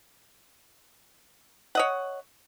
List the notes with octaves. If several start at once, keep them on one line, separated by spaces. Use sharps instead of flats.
C#5 D#5 F#5